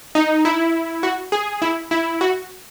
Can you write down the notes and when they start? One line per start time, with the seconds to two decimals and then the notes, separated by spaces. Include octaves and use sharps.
0.15 D#4
0.45 E4
1.03 F#4
1.32 G#4
1.62 E4
1.91 E4
2.21 F#4